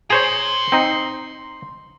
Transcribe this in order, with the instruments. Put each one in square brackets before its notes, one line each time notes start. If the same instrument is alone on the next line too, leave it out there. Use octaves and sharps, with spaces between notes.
[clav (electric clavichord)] G#4 C5 C#5 [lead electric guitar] A#5 C6
[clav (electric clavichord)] C4 D#4